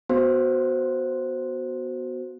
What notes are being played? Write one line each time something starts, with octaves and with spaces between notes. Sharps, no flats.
B3 F#4 C5